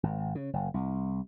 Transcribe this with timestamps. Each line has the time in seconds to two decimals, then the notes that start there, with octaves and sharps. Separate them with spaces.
0.03 G#1
0.35 C#3
0.53 F#1
0.74 C2